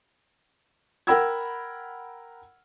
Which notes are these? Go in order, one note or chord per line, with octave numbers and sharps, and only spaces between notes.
A#4 F#5 G5 B5 E6 G#6